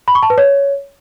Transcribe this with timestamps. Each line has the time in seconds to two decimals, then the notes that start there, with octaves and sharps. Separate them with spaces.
0.08 B5
0.15 C#6
0.23 A5
0.30 B4
0.38 C#5